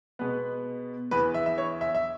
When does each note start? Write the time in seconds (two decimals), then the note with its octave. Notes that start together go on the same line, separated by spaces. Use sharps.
0.19 B2 G#3 B3 B4
1.11 E2 E3 B3 B4
1.34 E5
1.46 E5
1.58 C#5
1.81 E5
1.95 E5